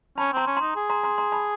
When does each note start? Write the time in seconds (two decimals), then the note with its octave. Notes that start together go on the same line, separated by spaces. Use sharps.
0.18 C#4 A5 B5
0.33 C4 A#5 C6
0.47 C#4
0.56 D#4 A#5 C6
0.76 G#4
0.90 A#5 C6
1.03 A#5 C6
1.18 A#5 C6
1.32 A5 B5